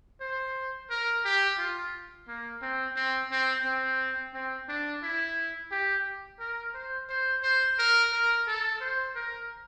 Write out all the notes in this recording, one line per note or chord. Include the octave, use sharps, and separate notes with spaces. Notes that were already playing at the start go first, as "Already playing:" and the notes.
C5
A#4
G4
F4
A#3
C4
C4
C4
C4
C4
D4
E4
G4
A#4
C5
C5
C5
A#4
A#4
A4
C5
A#4